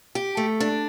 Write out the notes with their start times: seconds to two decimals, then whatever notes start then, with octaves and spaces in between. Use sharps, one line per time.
0.15 G4
0.37 A3
0.60 D4